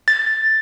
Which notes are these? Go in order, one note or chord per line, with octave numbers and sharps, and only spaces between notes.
A6